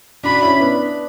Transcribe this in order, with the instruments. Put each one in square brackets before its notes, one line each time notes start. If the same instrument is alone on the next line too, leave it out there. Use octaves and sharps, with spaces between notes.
[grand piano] D4 F#4 [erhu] B5
[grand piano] C#4 E4
B3 D4